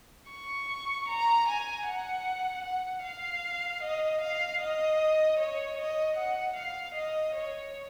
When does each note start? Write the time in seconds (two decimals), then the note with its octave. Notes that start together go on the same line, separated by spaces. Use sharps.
0.30 C#6
1.08 A#5
1.48 G#5
1.87 F#5
2.65 F#5
3.04 F5
3.82 D#5
4.21 F5
4.61 D#5
5.39 C#5
5.78 D#5
6.17 F#5
6.56 F5
6.94 D#5
7.35 C#5